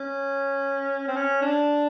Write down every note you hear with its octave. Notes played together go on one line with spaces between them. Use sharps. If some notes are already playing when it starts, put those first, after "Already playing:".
Already playing: C#4
C4
C#4
D4